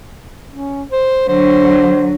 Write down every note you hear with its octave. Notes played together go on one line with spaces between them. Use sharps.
C#4
C5
D3 F#3 C5